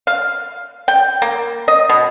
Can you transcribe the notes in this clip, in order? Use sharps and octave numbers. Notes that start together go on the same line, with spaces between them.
F5
G5
A#3
D#5
B2